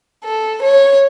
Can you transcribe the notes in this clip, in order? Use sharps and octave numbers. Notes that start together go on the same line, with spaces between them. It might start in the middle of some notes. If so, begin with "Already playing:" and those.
A4
C#5